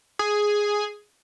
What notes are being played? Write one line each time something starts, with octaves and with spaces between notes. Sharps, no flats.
G#4